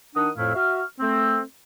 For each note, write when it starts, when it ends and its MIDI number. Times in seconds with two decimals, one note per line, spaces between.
0.15 0.29 51
0.15 0.29 62
0.15 0.29 78
0.15 0.29 87
0.36 0.51 41
0.36 0.51 45
0.36 0.51 57
0.36 0.51 64
0.36 0.51 77
0.54 0.82 66
0.54 0.82 76
0.54 0.82 85
0.54 0.82 89
1.00 1.41 57
1.00 1.41 60